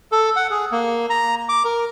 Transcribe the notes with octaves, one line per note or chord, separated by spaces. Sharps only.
A4
F#5
G#4
A#3
A#5
D6
A#4